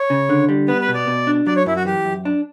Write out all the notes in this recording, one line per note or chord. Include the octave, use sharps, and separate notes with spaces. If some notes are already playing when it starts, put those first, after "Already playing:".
Already playing: C#5
C#3
D3
G3
B3 B4
B4
B2
D5
B2
D4
F#3 D5
C#5
F#2 E4
F#4
E3 G4
F#2
D4